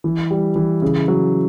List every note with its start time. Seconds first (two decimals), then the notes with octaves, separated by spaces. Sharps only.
0.04 E3
0.31 G3
0.56 E3
0.82 C#3
1.08 F#3